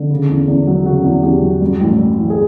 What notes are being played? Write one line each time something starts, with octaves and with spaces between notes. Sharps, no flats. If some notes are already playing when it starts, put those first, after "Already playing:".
Already playing: D3
C#3
E2
E2
F#3
C#3 F#4
E2
E2 G4
F#3
G2
A1
G3
E3
G#4